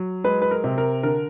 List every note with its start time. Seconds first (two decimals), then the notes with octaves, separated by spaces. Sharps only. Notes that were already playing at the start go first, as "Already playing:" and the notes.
Already playing: F#3
0.24 G#3 B4
0.42 B4
0.51 A#4
0.64 C3
0.78 A#4
1.03 D3 A#4